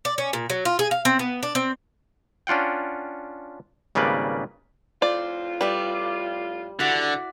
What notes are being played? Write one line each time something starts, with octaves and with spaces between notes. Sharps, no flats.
D5
C#4
A#2
F#3
F4
G#4
F5
C4
B3
D4
C4
C#4 D4 F4 F#5 G5
G#1 C#3 G3 A#3 B4 D5
F2 A2 F4 C5 D5
G3 B4 D5 E5
D3 E4 F#4 D5